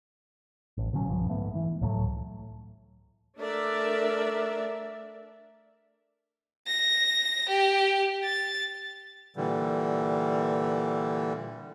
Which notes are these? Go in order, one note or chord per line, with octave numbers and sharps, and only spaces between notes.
A1
B2 D3 F#3 C#4
B1 G2 F3
G#2 A3 B3
E3
C#2 A2 F#3 A3
A3 D4 A#4 D5 E5
A#6
G4
A6
A#2 D3 E3 G3